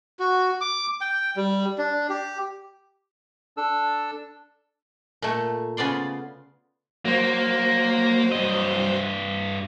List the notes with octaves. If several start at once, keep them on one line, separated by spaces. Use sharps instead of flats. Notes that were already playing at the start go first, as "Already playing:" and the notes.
F#4
D6
G5
G3
D4
G4
D4 A4 E6
A#2 A3
C#3 B3 F4 D5 C6
F#3 A#3 C5
G2 D#5